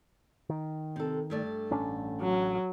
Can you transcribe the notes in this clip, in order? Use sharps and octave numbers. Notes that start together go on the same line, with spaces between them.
D#3
C3 A4
G2 A3 D5
A1 C#4 D4
F#3